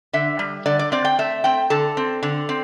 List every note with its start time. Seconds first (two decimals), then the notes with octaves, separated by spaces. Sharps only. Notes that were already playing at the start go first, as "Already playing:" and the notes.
0.13 D3 E5
0.39 G3
0.66 D3 D5
0.79 D5
0.92 C4 D5
1.05 G5
1.19 A3 E5
1.44 C4 G5
1.70 D3 A4
1.97 C4
2.23 D3
2.49 C4